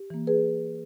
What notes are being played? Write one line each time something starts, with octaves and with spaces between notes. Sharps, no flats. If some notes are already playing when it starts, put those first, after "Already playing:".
Already playing: G4
E3 A#3
G#4 B4